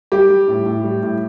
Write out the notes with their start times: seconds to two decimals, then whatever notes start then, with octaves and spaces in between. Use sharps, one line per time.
0.12 G3 G4
0.30 G3
0.48 A2
0.66 A2
0.84 G3
1.03 A2